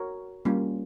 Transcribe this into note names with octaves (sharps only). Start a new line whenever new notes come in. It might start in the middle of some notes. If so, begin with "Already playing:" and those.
Already playing: F#4 A#4 C#5
G3 A#3 C#4 F4